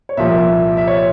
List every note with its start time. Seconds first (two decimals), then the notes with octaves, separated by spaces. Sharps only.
0.09 C#5
0.17 C2 A#2 F3 E5
0.77 E5
0.87 C#5